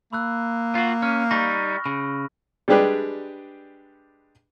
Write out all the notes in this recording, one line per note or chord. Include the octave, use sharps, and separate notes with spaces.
A#3 B5 E6 F#6
F4 F#4
C#4 F6
G3 D#4 B5 C#6 A#6
C#3 B5
G3 G#3 D4 G4 G#4 B4